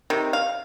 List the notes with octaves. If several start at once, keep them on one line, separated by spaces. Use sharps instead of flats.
C3 D#3
F5